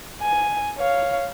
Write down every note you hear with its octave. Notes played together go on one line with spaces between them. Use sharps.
G#5
C#5 F5